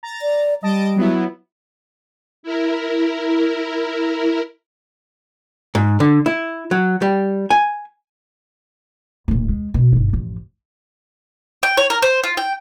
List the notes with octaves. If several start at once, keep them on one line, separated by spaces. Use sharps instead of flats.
A#5 A6
D5
G3 D#5 A5 D7
F#3 B3 E4
E4 A#4
G#2
D3
E4
F#3
G3
G#5
D1 A#2
G#3
B2
G1 D#3
A1 F2
G5
C#5
A#4
C5
F4
G5